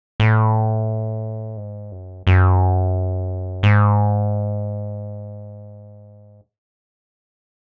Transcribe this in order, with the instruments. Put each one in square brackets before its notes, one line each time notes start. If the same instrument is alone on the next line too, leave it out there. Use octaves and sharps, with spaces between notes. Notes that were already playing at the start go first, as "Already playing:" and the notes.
[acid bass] A2
G#2
F#2
F#2
G#2